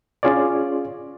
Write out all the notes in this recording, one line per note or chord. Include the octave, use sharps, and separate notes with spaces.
C#4 F4 G#4 C#5 D5